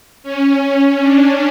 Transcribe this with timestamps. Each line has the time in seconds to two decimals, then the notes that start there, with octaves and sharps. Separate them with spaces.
0.23 C#4
1.01 D4